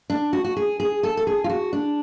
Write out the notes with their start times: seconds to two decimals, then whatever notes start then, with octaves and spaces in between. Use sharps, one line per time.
0.10 D4
0.33 F#4
0.44 F#4
0.57 G#4
0.80 G#4
1.03 A4
1.17 A4
1.27 G#4
1.44 F4
1.49 F#4
1.73 D4